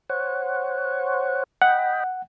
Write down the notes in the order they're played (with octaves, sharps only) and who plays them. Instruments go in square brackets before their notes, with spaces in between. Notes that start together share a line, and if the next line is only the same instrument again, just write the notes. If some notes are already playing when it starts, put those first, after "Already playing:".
[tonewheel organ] C5 C#5 F#5
[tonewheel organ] D#5 G5 B5 [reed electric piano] F#5